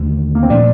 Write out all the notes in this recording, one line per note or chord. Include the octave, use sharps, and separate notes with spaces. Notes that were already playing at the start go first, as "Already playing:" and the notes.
Already playing: D#2 D3 A3
A#3
C4
A#2 F3 A3 D4